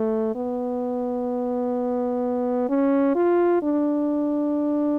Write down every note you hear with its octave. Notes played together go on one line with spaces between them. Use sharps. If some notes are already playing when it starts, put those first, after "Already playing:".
Already playing: A3
B3
C#4
F4
D4